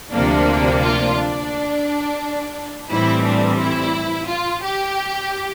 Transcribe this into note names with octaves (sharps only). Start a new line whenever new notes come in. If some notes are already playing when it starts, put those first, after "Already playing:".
D2 C3 F3 A#3 D4
F4
D4
A2 E3 G3 C4 E4
D4
E4
F4
G4